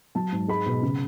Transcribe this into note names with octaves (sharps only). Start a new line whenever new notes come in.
F#3 A5
G#2
G#3 B5
B2
C#3